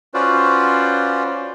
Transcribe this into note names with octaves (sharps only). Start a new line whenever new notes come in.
C#4 F4 F#4 B4 C5 D5